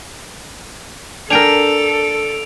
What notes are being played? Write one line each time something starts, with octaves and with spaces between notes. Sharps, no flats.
D4 A4 A#4 G5 G#5 D7 F7